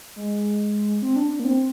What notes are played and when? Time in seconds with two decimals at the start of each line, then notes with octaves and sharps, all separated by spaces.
0.16 G#3
1.02 C4
1.16 D4
1.30 D4
1.40 A#3
1.44 C4